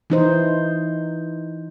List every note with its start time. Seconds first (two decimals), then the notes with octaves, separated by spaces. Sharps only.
0.10 E3 D#4 C5